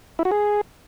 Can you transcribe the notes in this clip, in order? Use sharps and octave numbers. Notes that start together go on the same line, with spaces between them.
E4
F#4
G#4